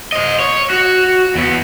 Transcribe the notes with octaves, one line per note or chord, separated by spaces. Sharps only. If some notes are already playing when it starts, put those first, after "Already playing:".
C5 D#5
C#5
F#4
E2 B3